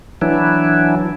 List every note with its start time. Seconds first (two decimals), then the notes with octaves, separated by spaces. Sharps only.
0.22 E3 F#3 D4 E4